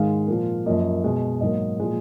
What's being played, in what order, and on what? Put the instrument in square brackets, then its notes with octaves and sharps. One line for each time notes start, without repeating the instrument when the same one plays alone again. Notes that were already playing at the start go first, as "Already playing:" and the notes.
Already playing: [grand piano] G#2 D#3 G#3 F5
A#2 F3 A#3
F#2 F3 A#3 D#5
B2 G#3
G#2 F#3 A#3 D#5
A#2 F3 G#3